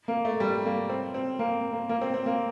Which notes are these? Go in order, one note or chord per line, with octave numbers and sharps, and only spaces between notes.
A#3
A3
G3
A#3
C4
C4
A#3
A#3
A#3
C4
C4
A#3